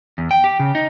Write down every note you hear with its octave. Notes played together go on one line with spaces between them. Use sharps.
E2
G5
G4
C#3
D#4